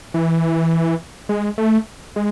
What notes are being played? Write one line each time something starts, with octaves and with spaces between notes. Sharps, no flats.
E3
G#3
A3
G#3